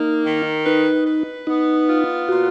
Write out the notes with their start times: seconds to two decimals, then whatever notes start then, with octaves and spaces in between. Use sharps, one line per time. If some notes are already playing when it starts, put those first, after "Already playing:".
Already playing: A#3 D#4
0.26 D#3
0.66 D#4 B4
1.07 B4
1.47 B3 D#4
1.89 F4
2.29 A#2 F#4